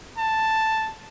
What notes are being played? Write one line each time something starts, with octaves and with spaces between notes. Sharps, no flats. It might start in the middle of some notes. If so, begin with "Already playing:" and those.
A5